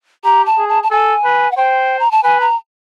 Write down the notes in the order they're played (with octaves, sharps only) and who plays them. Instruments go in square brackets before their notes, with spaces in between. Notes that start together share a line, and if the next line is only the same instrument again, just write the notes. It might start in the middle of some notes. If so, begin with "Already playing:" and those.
[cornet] G4 [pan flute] A#5
[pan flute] A5
[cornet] G#4
[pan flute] A5
A5
[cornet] A4 [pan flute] G#5
[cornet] B4
[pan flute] F#5
[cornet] C5 [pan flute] G5
[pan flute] A#5
A5
[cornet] B4 [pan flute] G#5
[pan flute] A#5